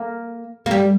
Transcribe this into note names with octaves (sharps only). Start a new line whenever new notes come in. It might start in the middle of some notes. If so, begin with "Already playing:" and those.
Already playing: A#3
A#3
G3